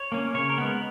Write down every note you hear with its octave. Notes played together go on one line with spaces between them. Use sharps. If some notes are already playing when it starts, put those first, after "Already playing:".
Already playing: C#5
A#3 C#4
C#3 C#5
A#4
G#3 B3